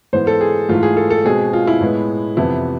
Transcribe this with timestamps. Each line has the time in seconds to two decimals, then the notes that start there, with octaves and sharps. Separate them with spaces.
0.13 G#2 E3 B3 C5
0.27 A4
0.41 G#4
0.69 G#2 E3 A3 F4
0.83 G#4
0.97 A4
1.10 A4
1.25 B2 G#3 C4 G#4
1.53 F4
1.67 E4
1.81 A2 G#3 B3
2.37 F2 C3 E3 B3 E4